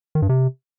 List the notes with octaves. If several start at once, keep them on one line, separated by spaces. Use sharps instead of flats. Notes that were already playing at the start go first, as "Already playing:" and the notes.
D#3
G2
C3